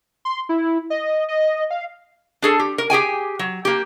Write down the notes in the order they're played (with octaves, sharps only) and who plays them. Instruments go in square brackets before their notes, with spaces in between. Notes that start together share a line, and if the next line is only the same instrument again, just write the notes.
[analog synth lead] C6
E4
D#5
D#5
F5
[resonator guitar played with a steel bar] D4 G#4 A4
G4
A#4
G4 G#4 G5 G#5
F#3
A#3 G4